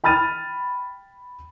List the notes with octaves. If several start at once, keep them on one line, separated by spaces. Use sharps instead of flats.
G5 B5 F6 A6 D#7